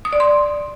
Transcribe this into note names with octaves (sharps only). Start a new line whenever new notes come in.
D#6
D5
C6